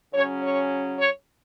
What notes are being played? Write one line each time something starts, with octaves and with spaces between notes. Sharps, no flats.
C#3 F#3 C#4 C#5
C#5
C#5